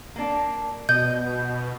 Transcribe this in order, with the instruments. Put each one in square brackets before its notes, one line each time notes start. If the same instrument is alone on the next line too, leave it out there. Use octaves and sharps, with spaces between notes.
[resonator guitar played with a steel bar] A#3 D4
[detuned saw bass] B2 [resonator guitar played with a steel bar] D#5 [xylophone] G6